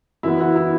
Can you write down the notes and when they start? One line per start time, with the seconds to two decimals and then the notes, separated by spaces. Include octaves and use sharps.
0.23 F#2 E3 B3 E4
0.40 F#4
0.56 E4